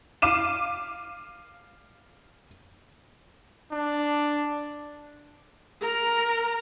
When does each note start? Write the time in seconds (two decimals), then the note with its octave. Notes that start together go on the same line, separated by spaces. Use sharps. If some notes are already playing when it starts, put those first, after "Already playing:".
0.22 F5 D6 D#7 E7
3.72 D4
5.82 A#4 A#5